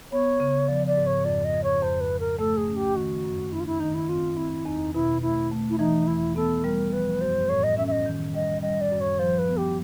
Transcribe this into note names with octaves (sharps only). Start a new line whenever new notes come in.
B3 C#5
C#3
F3 D5
D5
G#2
C#5
F2 D5
D#5
F2
C#5
F2 C5
B4
F2
A#4
A3 A4
G#4
C#4
G4
D#3 F#4
F#2
D4 E4
F4
E4
D#3 D#4
E4
C4 F4
C4 E4
E2 D#4
B2 E4
A3 E4
A3
E4
E3 D#4
E2 E4
B3 A4
G3 A#4
F3 B4
F#2 C5
A2 C#5
D#5
C#4 E5
E5
D#5
D#3
G3 D#5
G3 D#5
D5
F#2
C#5
F3 C5
B4
B3
G4